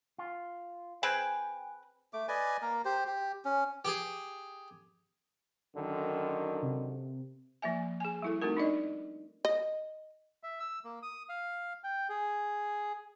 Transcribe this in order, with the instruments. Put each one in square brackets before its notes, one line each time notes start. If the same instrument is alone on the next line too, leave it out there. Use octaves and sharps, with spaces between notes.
[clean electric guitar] F4
[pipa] C4 G#4 B4 [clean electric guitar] G5 G#5
[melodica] A3 D6
B4 D5 D#5 G#5
A#3 A#4
G4 C5
G4
C#4
[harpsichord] G4 G#4
[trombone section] F#2 D3 D#3
[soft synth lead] C3
[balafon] F3 A#3 E5 G#5
G#4 G#5
G3 E4 A4
A3 C4 D#4 F#4 A#4
D4 D#4 D5 D#5
[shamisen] D#5
[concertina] E5
E6
A#3
D#6
F5
G5
G#4